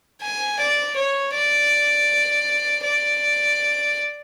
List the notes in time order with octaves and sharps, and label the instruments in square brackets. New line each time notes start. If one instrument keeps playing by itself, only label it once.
[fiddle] G#5
D5
C#5
D5
D5